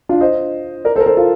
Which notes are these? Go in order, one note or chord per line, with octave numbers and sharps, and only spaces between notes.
D4 F4
C5 D#5
A#4 D5
A4 C5
A#4
A4 C5
F4 A4